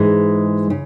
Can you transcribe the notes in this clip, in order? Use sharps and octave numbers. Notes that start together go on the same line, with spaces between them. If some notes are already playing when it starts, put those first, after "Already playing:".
Already playing: G#2 E3 G#3 D#4 G#4
C#3